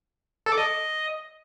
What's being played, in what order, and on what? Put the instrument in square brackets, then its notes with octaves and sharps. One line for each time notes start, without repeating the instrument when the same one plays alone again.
[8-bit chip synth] A4
D6
D#5